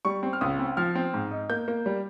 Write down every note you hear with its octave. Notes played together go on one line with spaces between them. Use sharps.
G3 C#6
C4
F6
C#2 D#6
C4
F3 F6
C4
G#2
D#4
A#3 G6
A#3
G3